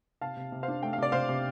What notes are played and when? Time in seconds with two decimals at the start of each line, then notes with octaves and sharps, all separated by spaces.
0.21 C3 F5 A5
0.37 C3
0.52 C3
0.63 C5 F5
0.68 D4
0.83 A3 G5
0.93 F5
0.98 C3 D5
1.12 C3 C5 F5
1.29 C3